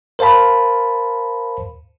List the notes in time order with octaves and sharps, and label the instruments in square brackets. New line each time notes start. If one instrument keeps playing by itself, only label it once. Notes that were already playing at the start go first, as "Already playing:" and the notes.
[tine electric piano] A#4 C5 F5 A5 B5